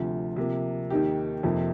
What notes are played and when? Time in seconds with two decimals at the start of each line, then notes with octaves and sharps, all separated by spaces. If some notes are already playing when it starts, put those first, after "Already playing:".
Already playing: D2 C3 F3
0.36 C3 F3 A#3
0.90 D#2 D#3 A#3 D#4 G4
1.43 F2 C3 F3 A#3 D#4